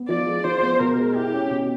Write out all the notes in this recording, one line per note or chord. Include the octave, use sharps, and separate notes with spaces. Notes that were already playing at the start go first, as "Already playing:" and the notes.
Already playing: B3
F3 D5
G#3
F3 C5
B3
B2 A#4
G#3
E4 G4
C#4
B2